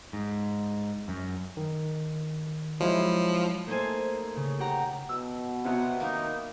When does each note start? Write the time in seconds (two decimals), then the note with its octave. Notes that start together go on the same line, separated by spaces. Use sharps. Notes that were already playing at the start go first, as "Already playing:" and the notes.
0.13 G#2
1.08 F#2
1.57 D#3
2.80 F3 F#3 G#3 E4
3.67 A3 A#3 D#4 A4 C5 G#5
4.36 C#3
4.60 G4 F#5 A#5
5.09 B2 E6
5.65 C3 F#3 B3 F#5
6.00 D#3 A#3 D#4